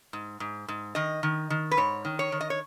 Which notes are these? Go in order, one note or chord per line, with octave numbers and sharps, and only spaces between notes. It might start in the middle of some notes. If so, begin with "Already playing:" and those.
G#2
G#2
G#2
D#3 D#5
D#3
D#3
B4
G#2 C#5
D#3
C#5
D#3
D#5
C#5